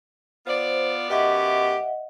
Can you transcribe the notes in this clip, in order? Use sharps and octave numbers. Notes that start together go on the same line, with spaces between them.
B3 F4 C5 D5
F#2 B3 G4 D#5 E5 F#5